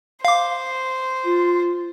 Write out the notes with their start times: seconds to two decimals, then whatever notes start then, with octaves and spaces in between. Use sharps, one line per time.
0.25 C5 F5 D6
1.23 F4